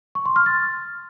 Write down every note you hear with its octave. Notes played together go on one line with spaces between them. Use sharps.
C#6
C6
F6
A6